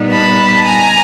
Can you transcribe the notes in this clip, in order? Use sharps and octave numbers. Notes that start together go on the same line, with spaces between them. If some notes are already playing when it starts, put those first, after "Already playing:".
Already playing: A#2 G3 B3 D#4
A5 B5
G#5 A#5